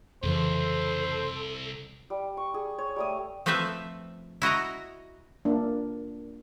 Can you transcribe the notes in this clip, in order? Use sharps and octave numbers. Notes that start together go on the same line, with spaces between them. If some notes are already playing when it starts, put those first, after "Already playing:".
C2 F2 C#3 E3 A4 C5
G3
C#6
G#4
C#5
G3 A3 D#6
F3 A3 C4 B4 E5 A5
E4 F#4 D#5 A#5
A#3 D4